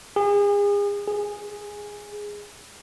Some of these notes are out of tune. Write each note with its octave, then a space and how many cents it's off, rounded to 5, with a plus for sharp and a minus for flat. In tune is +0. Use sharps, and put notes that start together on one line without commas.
G#4 -35
G#4 -5